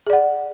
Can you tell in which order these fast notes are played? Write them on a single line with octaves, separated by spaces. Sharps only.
G#4 D5 F#5